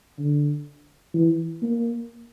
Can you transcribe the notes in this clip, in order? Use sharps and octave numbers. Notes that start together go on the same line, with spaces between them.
D3
E3
A#3